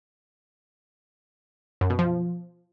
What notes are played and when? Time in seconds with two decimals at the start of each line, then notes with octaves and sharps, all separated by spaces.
1.81 F#2
1.90 B2
1.99 F3